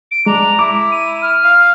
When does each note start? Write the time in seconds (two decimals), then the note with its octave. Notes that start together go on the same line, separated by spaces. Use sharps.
0.11 D7
0.26 G#3 D4 A#5
0.59 E4 D6
0.92 D#7
1.22 F6
1.44 F5